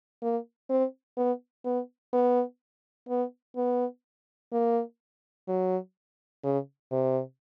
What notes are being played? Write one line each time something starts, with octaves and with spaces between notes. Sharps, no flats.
A#3
C4
B3
B3
B3
B3
B3
A#3
F#3
C#3
C3